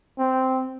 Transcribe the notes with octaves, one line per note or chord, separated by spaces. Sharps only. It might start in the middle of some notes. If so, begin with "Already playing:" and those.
C4